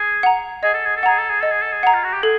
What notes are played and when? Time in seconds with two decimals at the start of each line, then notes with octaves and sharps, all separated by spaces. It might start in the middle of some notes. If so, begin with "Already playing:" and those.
Already playing: G#4
0.23 F#5 A#5
0.63 G#4 D#5
0.74 A4
0.86 G#4
0.96 A4
1.03 G#4 F#5 A#5
1.19 A4
1.30 G#4
1.41 A4 D#5
1.51 G#4
1.62 A4
1.73 G#4
1.83 F#5 A#5
1.94 F4
2.04 F#4
2.14 G4
2.23 G#4 A4